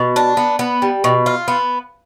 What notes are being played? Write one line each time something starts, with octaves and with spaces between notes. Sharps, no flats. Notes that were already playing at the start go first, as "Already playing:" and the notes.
Already playing: B2
D4
B3
B3
G3
B2
F4
B3